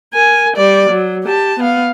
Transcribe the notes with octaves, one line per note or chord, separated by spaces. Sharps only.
A#4 G#5
G3 D5
F#3
G4 A5
B3 F5